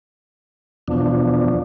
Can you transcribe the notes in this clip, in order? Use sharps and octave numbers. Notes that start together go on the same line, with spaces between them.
E2 B2 F3 D4